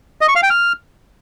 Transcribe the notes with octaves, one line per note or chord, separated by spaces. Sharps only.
D#5
C#6
F5
G5
F6